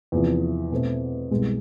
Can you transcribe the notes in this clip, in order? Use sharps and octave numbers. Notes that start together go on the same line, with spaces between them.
E2 C3 F3
B2 A3 C4
C2 B2 G#3